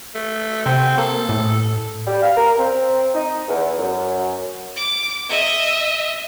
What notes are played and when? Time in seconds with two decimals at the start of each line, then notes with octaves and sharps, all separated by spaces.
0.15 A3
0.66 C3 C4
0.98 A#3 A4
1.29 A2
2.06 G3
2.22 F5
2.37 A#4
2.58 C4
3.14 D#4
3.48 E2
3.77 F#2
4.76 D6
5.29 D#5 E5